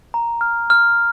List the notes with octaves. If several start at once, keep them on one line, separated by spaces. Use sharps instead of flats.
A#5
F6
F6